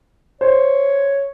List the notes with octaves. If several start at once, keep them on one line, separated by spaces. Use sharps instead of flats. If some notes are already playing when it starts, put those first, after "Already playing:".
C5 C#5